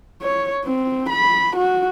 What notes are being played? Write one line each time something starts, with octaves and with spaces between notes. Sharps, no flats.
C#5
C4
B5
F#4